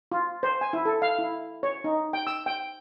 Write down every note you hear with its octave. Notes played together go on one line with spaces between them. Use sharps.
F4
C5
G#5
E4
A4
F5
E4
C#5
D#4
G5
E6
G5